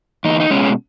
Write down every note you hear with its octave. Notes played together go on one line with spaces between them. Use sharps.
E2 D#4
D#4
B2 G#3 C#4